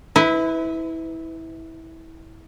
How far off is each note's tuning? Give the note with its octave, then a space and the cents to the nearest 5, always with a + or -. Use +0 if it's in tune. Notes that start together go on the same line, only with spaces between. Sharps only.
E4 -20 B4 +20